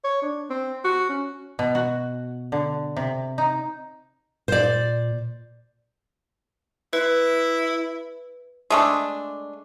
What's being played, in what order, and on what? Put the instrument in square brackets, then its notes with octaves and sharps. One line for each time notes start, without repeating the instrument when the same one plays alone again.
[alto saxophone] C#5
D4
C4
F#4
C#4
[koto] B2
F#4
D3
C3
D#4
[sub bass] A#2 [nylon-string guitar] C5 D5
[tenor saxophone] E4 [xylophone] B4
[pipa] G#3 A3 D4